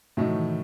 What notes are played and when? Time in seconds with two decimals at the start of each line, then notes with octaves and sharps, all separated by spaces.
0.17 A2 C3 F#3 A3 D#4
0.27 E3
0.36 D#3